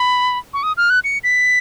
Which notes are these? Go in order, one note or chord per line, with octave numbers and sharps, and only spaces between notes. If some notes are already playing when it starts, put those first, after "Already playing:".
Already playing: B5
C#6
D#6
F6
F#6
C#7
B6